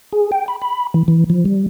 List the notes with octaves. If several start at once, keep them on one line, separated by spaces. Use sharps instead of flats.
G#4
G5
B5
B5
E3
E3
F3
G3